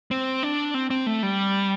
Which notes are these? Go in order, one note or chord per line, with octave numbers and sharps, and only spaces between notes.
C4
D4
C4
C4
A3
G3